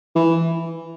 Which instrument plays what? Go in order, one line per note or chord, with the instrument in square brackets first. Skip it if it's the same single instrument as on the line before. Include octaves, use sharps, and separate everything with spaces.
[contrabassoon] E3